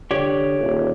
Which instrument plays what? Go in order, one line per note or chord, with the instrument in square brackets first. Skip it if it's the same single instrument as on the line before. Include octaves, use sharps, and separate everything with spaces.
[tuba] D3 [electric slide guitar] G4 C#5 D5
[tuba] D#1